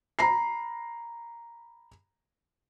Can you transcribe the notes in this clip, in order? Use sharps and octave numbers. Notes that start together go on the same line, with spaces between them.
A#5 B5 C7